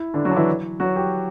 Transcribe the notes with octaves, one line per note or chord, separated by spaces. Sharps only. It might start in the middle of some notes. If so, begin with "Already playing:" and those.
Already playing: E4
D3 D4
F#3 F#4
D4
E3 E4
F#3 F#4
G4